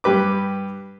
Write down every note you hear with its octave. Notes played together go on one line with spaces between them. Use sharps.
G2 G4 B4 D6